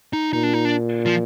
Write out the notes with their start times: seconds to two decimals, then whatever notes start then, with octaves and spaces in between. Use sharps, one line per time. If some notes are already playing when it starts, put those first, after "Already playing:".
0.13 D#4
0.33 A#2 D#4
0.43 D4
0.54 D#4
0.65 D4
1.06 F3